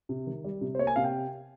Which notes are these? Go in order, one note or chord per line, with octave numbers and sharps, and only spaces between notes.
C3
D#3
G3
C3
C5
A#3 C#5
G#5
C3 F5
G5